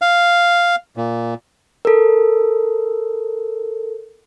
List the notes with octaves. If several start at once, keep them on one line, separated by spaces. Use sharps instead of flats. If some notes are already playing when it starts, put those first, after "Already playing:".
F5
A#2
A4 A#4